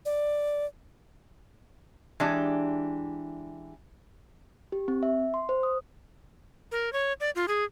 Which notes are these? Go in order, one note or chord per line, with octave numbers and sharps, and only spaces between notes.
D5
E3 G#3 D4 G4
G4
C4
E5
C6
C5
D#6
A#4
C#5
D5
F4
G#4